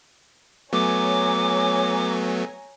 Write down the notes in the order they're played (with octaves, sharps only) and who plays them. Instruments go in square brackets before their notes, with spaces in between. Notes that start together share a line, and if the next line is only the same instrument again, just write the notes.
[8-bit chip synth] F#3 A3 B3 [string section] C#5 G#5 A#5 [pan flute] D6